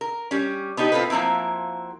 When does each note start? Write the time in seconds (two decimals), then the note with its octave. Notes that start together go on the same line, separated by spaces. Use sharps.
0.01 A#4
0.31 G3 C#4
0.77 B3 D4 D#4 G4
0.92 A2 C4 F4 G#4 A4 B4
1.10 F3 F#3 A#3 C4 E4